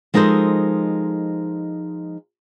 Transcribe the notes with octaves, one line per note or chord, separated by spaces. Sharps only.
F3 G#3 D#4 A4 A#4 C5